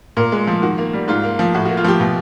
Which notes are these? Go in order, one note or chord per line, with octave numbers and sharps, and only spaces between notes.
A#2 A#4
G#3
F3
D#3 F#4
A#3
G3
G#2 F4
A#3
F3
A2 F#4
A#3 F#4
F4
F3 G4
B2